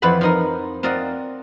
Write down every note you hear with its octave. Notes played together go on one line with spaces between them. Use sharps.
F2 E3 B4 C5 F#5 B5
F3 D#4 A#4
C4 F4 A#4 D5 D#5 F#5